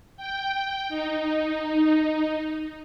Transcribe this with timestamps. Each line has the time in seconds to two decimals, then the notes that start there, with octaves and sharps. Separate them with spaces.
0.17 G5
0.89 D#4